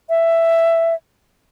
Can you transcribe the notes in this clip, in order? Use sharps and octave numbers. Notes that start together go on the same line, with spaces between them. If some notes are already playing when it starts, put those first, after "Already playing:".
E5